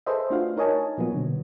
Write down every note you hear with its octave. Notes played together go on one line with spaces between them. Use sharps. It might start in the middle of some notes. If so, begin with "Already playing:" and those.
G#4 A4 B4 C5 D#5 E5
A3 D4 F4 F#4 F5
D#4 A#4 C#5 D#5 G#5 A5
A#2 F3 F#3 A#3 B3
B2 D3 F#3